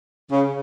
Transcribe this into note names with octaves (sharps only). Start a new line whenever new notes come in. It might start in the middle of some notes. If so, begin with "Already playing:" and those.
C#3